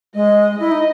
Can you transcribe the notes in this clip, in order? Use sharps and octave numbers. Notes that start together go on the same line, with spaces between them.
G#3 D#5
E4 D#5
D#4